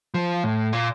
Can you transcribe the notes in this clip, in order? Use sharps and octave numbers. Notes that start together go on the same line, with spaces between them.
F3
A2
A#2